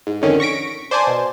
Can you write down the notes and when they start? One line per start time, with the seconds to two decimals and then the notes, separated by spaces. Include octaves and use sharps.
0.07 G#2
0.22 F2 D3 D#3 C#4
0.40 C#6 A#6 B6 D7
0.91 C5 D5 G#5 A5
1.07 B2